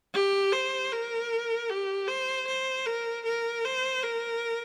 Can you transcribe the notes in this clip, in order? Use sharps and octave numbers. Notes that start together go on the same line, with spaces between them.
G4
C5
A#4
G4
C5
C5
A#4
A#4
C5
A#4